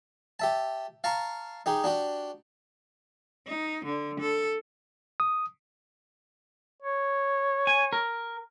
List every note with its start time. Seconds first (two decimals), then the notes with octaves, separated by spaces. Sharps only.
0.40 G4 E5 A5
1.04 F5 A5 A#5 C#6
1.66 D#4 G4 G#4
1.84 D4 F#4 G4
3.47 D#4
3.85 D3
4.20 A4
5.20 D#6
6.82 C#5
7.67 G#5
7.93 A#4